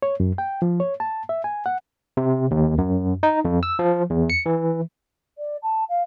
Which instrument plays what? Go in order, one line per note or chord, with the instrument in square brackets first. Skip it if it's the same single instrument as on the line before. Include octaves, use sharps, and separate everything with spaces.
[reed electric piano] C#5
F#2
G5
F3
C#5
A5
E5
G#5
F#5
[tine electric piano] C3
D#2
F#2
D#4
F2
E6
F3
E2
C#7
E3
[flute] D5
A5
F5